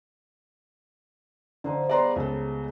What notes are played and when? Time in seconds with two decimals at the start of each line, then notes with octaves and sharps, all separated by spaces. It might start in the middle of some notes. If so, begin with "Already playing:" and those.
1.64 D3 F3 D#4 C5
1.89 G3 B3 G#4 D5 A#5 C6
2.16 C#2 A4